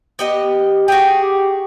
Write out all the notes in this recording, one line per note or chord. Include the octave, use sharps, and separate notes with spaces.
B3 G4 D#5
F#4 G#4 G5
G4